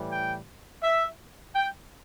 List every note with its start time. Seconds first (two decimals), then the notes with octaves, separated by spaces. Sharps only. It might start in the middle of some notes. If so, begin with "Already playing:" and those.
Already playing: A2 E3 G3
0.09 G5
0.83 E5
1.55 G5